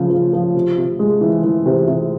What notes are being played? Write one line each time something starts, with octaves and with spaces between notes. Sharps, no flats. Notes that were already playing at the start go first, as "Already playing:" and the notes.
Already playing: C#3 F3
F3
F3
C3
C3
G#3
E3
E3
C3
C3